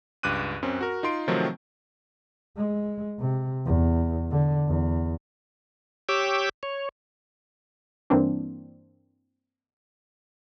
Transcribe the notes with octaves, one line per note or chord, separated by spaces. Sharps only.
C#2 G2 D6 F#6 D#7
F#2 C4 C#4
F#4 A#4
D#4 F4 C6 D7
C3 D#3 F3 F#3 A3 C4
G#3
C3
E2
D3
E2
G4 C#5 G5 D6 E6
C#5
G2 E3 A#3 C4 D4